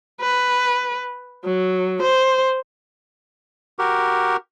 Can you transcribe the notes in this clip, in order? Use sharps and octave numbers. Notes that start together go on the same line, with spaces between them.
B4
F#3
C5
F#4 G4 A#4